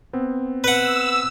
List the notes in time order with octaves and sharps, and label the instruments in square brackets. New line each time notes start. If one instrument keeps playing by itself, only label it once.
[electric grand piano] B3 C4
[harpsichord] B4 F#5 [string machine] E6